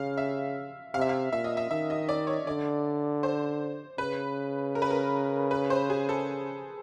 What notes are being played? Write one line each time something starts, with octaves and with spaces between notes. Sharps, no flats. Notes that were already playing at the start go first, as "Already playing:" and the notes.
Already playing: C#3 F5
E5
C3 F5
E5
F5
A#2 E5
D#5
E5
D#3 E5
D#5
D5
C#5
D3 D5
C5
C#3 B4
A#4
B4
A#4
B4
C5
G#4
A4